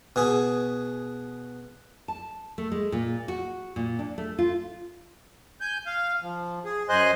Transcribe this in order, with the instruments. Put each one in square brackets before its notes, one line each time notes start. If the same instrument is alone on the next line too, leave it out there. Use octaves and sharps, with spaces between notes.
[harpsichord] B2 G#4
[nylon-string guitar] A5
A3
G#3
A#2
F#4
A#2
D4
A3
F4
[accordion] G#5 G6
F5
F3
G#4
F#2 C5 D#5 G#5 C6 F#6